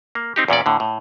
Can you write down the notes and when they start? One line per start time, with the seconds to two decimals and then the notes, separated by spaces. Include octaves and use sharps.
0.15 A#3
0.36 C4 D#4 G4
0.48 E2 A#2 C#4 D5
0.66 A2 D3
0.80 A2